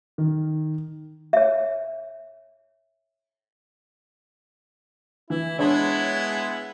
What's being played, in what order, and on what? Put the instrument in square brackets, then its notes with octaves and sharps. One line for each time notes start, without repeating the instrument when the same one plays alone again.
[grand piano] D#3
[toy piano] C#5 E5
[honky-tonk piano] E3 [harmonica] E4
[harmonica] G#3 B3 E4 [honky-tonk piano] D4 C#5